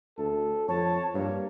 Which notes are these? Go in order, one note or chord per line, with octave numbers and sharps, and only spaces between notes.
D2 A4
F2 C#5 A5
G2 A#3 C#5